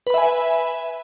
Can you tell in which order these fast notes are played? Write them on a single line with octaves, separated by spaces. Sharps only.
B4 B5 E5 G#5